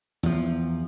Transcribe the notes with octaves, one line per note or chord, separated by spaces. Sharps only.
E2 F3